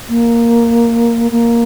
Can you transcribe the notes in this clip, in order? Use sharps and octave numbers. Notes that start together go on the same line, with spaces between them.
A#3
A#3